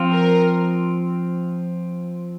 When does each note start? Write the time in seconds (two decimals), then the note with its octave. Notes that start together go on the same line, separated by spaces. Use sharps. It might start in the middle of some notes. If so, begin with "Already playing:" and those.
Already playing: F3 C4 F4
0.12 A#4